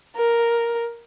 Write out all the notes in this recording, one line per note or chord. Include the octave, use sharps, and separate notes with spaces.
A#4